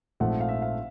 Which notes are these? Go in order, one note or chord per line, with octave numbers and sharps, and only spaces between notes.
A#1 G#2 F3 A3 C4 F#5
F5
E5
F5